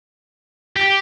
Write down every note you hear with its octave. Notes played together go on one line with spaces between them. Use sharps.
G4